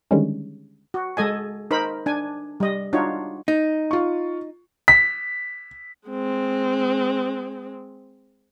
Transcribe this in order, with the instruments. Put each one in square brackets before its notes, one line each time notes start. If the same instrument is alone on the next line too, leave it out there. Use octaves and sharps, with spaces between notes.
[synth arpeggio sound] D3 D#3 G3 G#3 C#4
[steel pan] F#4
G#3 A4 D#5 G#5
D#4 A#4 C5 B5
D4 G#5
G3 D#5
D4 D#4 F4 F#4 C#5
[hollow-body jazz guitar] D#4
[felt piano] F4 C#6
[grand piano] B6
[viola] G#3 C4